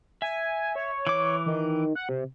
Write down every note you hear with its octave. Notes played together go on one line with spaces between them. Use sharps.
E5 G#5
C#5
E3 D6
D#3
F#5
C3